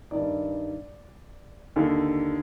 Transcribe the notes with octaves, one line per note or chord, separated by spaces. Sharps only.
G2 D#3 D5
D#2 D3